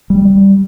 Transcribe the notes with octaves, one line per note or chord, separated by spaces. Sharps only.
G3